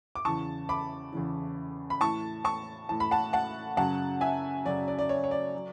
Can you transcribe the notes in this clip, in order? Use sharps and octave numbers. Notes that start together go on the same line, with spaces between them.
D6
E2 C#3 E3 A5 C#6
B5 D6
E2 C#3 E3
B5
A2 E3 A5 C#6
A5 C#6
A2 E3 A5
B5
F#5 A5
F#5 A5
F#2 C#3 F#3 F#5 A5
E5 G#5
F#2 C#3 F#3 D5
D5
D5
C#5
C#5
D5
F#3